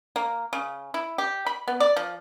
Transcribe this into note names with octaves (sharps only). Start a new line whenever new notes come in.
A#3
C#3
E4
G4
B5
B3
D5
F3